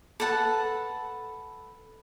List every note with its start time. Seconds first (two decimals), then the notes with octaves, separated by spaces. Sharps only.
0.20 A4 B4 F#5 A5